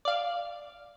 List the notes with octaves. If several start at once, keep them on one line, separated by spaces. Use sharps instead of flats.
D5 F5